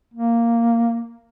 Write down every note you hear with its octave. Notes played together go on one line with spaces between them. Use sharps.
A#3